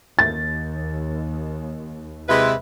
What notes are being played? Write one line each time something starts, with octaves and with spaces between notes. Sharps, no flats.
D#2 A6
C3 G#3 E4 B4